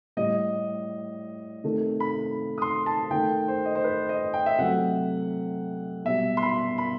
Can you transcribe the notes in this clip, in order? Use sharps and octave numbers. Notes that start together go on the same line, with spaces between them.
A2 G3 D#5
C3 D#3 A3
B5
D#6
C6
A5
D#3 A3 G5
C5
D#5
C5
B4
D#5
G5
E5
C3 F#3 A3 F#5
B2 G3 E5
C6
B5
B5